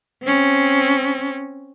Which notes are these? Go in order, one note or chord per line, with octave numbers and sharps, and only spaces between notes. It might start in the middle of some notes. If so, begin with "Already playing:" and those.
C4 C#4